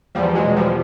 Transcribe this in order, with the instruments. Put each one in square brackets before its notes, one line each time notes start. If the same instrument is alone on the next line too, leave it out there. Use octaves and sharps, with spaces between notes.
[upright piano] E2 [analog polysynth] F3 G3
[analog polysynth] F#3 G#3
[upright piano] B2
[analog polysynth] F3 G3